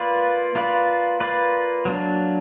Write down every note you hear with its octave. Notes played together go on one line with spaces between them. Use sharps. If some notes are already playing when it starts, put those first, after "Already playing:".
Already playing: A#3 F4 B4 D5
A#3 F4 B4 D5
A#3 F4 B4 D5
F#3 A#3 D4